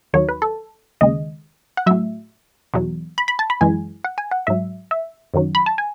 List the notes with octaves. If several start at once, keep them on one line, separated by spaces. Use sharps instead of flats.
D#2 D#3 F#3 C#5
B4
A4
D#2 C#3 G#3 D#5
F#5
A2 F#3 E5
E2 B2 F#3
B5
B5
A5
B5
F#2 E3 G#3 G#5
F#5
G#5
F#5
G#2 F#3 E5
E5
F#2 D#3 F#3
B5
A5
G#5